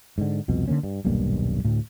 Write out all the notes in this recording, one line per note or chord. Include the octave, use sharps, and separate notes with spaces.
G#2 D3
C2 F2 B2
D3 F#3 A#3 C#4
G2
D#1 B1 G2 A#3
D2 A2